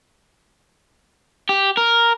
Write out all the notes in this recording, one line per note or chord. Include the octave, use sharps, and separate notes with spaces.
G4
A#4